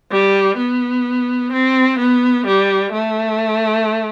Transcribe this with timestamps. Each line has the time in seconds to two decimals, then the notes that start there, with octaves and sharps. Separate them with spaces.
0.11 G3
0.57 B3
1.53 C4
1.99 B3
2.47 G3
2.92 A3